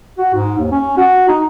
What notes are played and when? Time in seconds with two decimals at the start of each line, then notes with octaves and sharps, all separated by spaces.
0.18 F#4
0.34 G#2
0.59 D#2
0.72 C#4
0.97 F#4
1.28 D#4